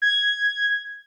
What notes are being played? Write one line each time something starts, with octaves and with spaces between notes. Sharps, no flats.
G#6